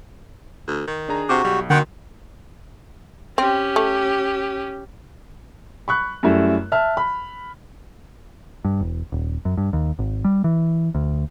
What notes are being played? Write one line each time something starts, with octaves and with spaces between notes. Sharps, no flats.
D2
D#3
D4 G#4 A#5
C3 F#4 D6
B1 G3
D#2 D3 D#3 F#4 F#5 G5 C6
C4 C#4 G4
A3
B5 C#6 F#6
F#2 G3 A3 E4
E5 A5 F6
B5
G2
E1
D#1
F#2
G2
D#2
G#1
G3
E3
D2